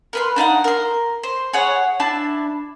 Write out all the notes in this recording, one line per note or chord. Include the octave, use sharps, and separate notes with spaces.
A#4 B4 C6
D4 D#4 F5 F#5
A#4 C6
C5
G#4 C#5 F#5
D4 E4 A5